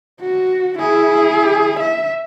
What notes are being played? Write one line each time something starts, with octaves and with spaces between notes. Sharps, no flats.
F#4
E4 G#4
E5